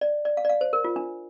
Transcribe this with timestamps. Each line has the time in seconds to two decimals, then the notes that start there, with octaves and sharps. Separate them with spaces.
0.01 D5
0.25 D5
0.37 F5
0.45 D5
0.49 F5
0.61 C5
0.73 A#4
0.85 F4
0.96 D4